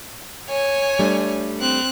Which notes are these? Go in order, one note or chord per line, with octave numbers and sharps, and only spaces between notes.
C#5 G#5
G3 A3 D4
C4 F#6